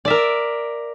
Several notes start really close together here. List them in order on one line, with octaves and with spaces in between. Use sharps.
D5 E5 A#4